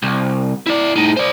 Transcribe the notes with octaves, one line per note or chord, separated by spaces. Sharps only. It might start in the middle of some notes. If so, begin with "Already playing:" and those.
C2
E4 D5
A2 D#4
C5 D5